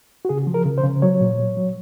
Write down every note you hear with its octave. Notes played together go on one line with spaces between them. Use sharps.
F#4
C#3 G#4
F3
A#4
C#3
C5
C#3
F#3 C#5
A#2
F#3
F#3